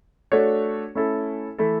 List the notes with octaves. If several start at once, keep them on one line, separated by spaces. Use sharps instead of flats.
A3 D4 F#4 A4 C#5
A3 C#4 E4 A4
E3 A3 E4 A4